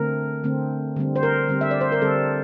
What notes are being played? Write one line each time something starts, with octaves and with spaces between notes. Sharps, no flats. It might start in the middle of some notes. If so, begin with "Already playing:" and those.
Already playing: D3 A3 C4 A#4
D3 A3 C4
D3 G3 C4
C5
A#4
D3 G3 C4
E5
D5
C5
A#4
D3 G3 C4 A4